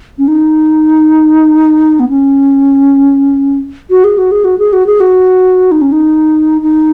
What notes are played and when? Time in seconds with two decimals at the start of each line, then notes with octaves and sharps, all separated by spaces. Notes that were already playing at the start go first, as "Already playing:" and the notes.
0.18 C#4
0.28 D#4
2.00 B3
2.09 C#4
3.90 F#4
4.04 G#4
4.18 F#4
4.31 G#4
4.44 F#4
4.58 G#4
4.73 F#4
4.86 G#4
5.00 F#4
5.71 D#4
5.81 C#4
5.92 D#4
6.62 D#4